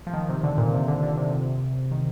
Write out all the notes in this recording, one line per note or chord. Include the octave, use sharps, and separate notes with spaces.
F3
D#3
C3
D3
A#2
C3
D3
D3
C3
D#3